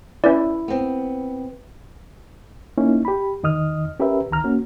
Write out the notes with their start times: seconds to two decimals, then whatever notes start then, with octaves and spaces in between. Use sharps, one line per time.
0.24 C#4 E4 B4 D5
0.68 B3 C4
2.78 A#3 C#4 D#4 E4
3.05 G4 B5
3.43 E2 D#3 D#5 D#6 F6
3.99 C#4 G4 A#4 B4 E5
4.31 C#2 D#3 A#5 F6
4.44 A#3 C#4 F#4